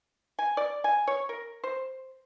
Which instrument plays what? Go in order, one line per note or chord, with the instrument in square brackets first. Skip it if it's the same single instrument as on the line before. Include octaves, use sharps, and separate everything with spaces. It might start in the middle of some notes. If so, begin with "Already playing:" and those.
[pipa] G#5
D5
G#5
C#5
A#4
C5